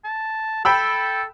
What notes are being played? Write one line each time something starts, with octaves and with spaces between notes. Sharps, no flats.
A5
A4 G5 B5 E6